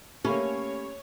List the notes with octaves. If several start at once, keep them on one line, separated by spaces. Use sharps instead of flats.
A3 A#3 C#4 G4 C#5 B5